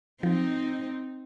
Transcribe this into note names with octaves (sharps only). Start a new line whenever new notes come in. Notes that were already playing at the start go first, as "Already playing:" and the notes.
F3 C4 D#4